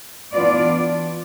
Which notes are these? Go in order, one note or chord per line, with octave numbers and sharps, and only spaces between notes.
E3 B3 D4 F4 D5